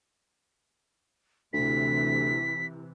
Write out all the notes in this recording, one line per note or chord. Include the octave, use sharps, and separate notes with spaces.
D2 C3 E3 B6